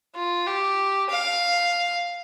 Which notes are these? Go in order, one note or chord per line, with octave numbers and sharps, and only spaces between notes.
F4
G4
F5